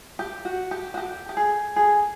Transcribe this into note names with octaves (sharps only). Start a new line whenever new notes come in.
G4
F#4
G4
F#4
G4
G4
G#4
G#4